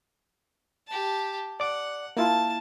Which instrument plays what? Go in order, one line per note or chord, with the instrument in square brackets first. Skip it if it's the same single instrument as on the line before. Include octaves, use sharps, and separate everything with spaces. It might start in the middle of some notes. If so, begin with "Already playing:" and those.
[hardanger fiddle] G4 A5
[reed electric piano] D5 D6 [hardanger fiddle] F#5
[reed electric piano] A#3 E4 F4 [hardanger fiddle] A5